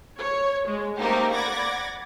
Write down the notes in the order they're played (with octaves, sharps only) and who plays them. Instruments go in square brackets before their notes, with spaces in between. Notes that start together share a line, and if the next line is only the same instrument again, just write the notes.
[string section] C#5
G#3
A3 A#3 C4 D#4 G4 A#4
D5 F#5 B5 D6 G#6 A#6